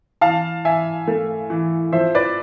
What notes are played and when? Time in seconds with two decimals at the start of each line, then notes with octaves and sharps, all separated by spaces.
0.21 E3 F5 A5
0.65 E3 E5 G#5
1.08 A3
1.50 E3
1.93 F3 C5 E5
2.15 B4 D5